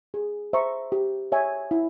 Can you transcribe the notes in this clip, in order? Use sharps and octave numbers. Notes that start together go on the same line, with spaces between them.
G#4
C5 E5 A#5 C#6
G4
C#5 E5 G#5
E4